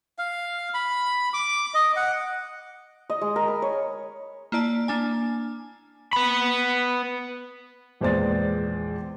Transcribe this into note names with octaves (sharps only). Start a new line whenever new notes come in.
F5
B5
D6
D#5
F#5
D#5
G#3
A#4
B5
C#5
A#3 E4 D5 A5
A#3 D4 G#5
B3 B5
A#1 E2 G#3 C5 D5 A6